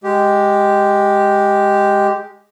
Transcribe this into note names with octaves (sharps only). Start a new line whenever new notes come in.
G#3 G4